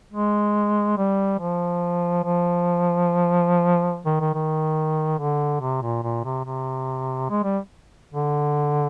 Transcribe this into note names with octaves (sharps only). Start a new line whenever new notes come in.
G#3
G3
F3
F3
D#3
D#3
D#3
D3
C3
A#2
A#2
C3
C3
G#3
G3
D3